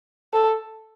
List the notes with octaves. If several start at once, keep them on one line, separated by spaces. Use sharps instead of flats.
A4